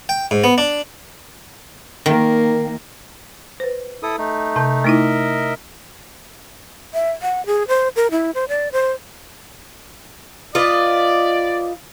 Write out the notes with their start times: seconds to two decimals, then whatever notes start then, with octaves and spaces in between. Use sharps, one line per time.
0.09 G5
0.31 G#2
0.44 B3
0.58 D4
2.06 D#3 A#3
3.60 B4 C5
4.03 E4 A4 D#6
4.18 A3 D#4
4.56 C3 A5 G6
4.84 A3 D#4 E4 A#4 D#5 E5
6.94 E5
7.22 F#5
7.46 G#4
7.68 C5
7.96 A#4
8.11 E4
8.35 C5
8.49 D5
8.72 C5
10.55 F4 B4 D5 D#5